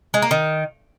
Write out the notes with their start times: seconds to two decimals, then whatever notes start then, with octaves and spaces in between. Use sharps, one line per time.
0.14 G#3
0.22 A#3
0.31 D#3